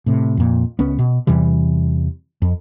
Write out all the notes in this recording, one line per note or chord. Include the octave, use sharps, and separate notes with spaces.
A2 C3
F2 A#2
C#2 B3 C#4
B2
E2 C3 E3 G3
F2